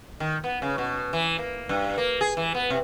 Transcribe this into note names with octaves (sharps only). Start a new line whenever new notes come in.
D#3
B3
C#3
B2
E3
A#3
G2
A#3
G#4
E3
B3
C3